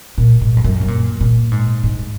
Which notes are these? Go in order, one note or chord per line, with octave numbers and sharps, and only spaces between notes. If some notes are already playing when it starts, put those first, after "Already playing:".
A#2
G#2
F2
F#2
C3
A#2
A#2
G#2
G#2